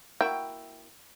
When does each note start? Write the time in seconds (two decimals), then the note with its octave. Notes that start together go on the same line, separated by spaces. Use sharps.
0.21 A#3 E4 F#4 G5